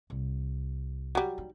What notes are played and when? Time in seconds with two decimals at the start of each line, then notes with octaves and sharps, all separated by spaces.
0.10 C2
1.15 F#3 G3
1.38 D#4